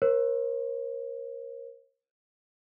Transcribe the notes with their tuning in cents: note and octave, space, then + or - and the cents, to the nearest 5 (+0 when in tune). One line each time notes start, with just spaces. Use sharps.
A#4 +20 C#5 -45